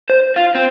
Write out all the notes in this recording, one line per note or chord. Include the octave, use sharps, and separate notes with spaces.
C5
F4
C4